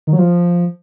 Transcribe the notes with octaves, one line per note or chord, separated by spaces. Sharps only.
D#3
F#3
F3